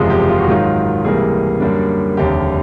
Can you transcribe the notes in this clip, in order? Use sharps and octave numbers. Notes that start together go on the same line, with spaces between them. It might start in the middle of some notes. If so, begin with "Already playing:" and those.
Already playing: F#1 E2 C3 F3 G#3 G#4
G4
F4
F#4
G#2 D#3 F#3 F4
C#2 C3 E3 G3 A#3 G#4
F#2 D3 G3 A#3 D4
F1 D#2 D3 G4